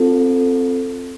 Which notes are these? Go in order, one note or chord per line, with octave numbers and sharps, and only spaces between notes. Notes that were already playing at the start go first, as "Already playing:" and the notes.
Already playing: C4 F4 A4